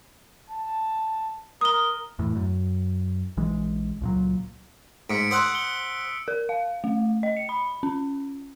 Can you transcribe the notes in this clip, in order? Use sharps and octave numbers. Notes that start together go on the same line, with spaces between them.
A5
A#4 D#6 G7
E2 A2
F#2
A#1 E3 G#3
C#2 A#2 F#3
G#2 B6 C#7 D7
C5 F#5 D#6 E6 F#6
C#7 G7
A#4
F5
A3
D#5
C#7
B5
C#4